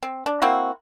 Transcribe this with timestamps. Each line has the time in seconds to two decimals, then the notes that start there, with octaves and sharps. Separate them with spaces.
0.03 C4
0.26 D4
0.42 A#3 C4 E4 F#4